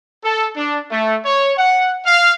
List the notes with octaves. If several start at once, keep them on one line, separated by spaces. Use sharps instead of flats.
A4
D4
A3
C#5
F#5
F5